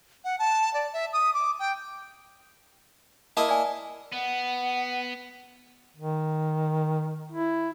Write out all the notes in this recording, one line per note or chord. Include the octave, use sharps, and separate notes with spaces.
F#5
A5
D5
E5
D#6
D6
G5
A#3 E4 D#5 A5
D5 G#5
B3 F#5
D#3
E4